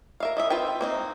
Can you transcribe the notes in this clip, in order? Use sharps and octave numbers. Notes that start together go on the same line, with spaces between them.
A#4 E5 F5
E3 D#5 E5
C4 F4 B4 G5
A#3 C4 D#4